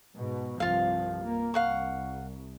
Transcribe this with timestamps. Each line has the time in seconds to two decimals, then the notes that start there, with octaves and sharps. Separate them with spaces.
0.17 G#2 B2
0.60 C2 G2 F3 F4 F5
1.24 A#3
1.54 C2 F5 F#5 C#6